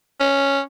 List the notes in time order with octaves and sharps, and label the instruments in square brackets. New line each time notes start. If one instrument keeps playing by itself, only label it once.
[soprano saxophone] C#4